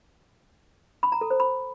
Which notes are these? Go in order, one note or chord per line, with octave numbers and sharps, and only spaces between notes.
B5
A#5
A4
C5
B5